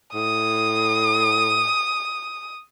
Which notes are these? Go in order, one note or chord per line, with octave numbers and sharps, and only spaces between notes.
A2 D#6